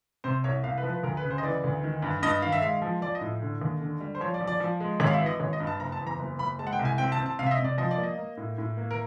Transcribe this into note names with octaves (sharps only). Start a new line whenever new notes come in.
C3 C5
C2 C#5
C2 F5
B4
F3
B4
D2 A#4
B4
C#3
C5
D#5
E3 D5
D2
D#3
G2
G2 D#5
D#3 F5
E5
G#3 F5
F3
F3 D5
D#5
A2
D3
D#2
D3
G3
C5
F3 C#5
D5
F3
D5
F3
G#3
G#1 C#5
F5
E5
E3
D#5
G#1 C#5
D#5
G2
A5
F#1 A#5
A5
E2
A#5
F#1
F#1 B5
G#3 A5
F#5
G5
C2
G#5
C4 G5
A5
C4
A5
C3 F5
E5
D#5
C3
D5
F3 D#5
D5
A#3
D#5
A#3
A2
A2
A#3
A#4